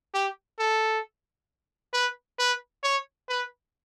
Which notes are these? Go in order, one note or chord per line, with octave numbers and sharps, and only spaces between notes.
G4
A4
B4
B4
C#5
B4